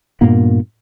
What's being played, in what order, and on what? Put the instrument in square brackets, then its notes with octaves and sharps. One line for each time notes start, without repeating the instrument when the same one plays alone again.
[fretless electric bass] G2 A#2 A#3 B3